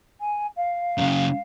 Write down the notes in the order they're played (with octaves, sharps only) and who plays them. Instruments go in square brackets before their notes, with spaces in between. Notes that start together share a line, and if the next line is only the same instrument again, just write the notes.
[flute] G#5
F5
[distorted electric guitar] F#2 C#3